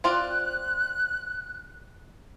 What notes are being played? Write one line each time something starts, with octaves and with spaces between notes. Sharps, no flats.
C4 F4 D5 F#6